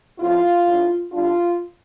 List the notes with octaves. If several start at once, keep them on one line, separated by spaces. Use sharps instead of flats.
A2 F3 C4 F4
A2 G3 D4
D3 G3 D4 F4